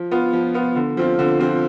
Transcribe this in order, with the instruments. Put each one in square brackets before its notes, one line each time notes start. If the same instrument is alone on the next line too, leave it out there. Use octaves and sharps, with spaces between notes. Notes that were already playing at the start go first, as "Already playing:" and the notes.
Already playing: [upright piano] F3
B3 F4
F3
B3 F4
D3
F3 C4 F4
D3
F3 C4 F4